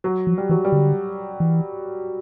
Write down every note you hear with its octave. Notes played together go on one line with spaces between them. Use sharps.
F#3
F3
G3
E3 F#3
G3
D3
E3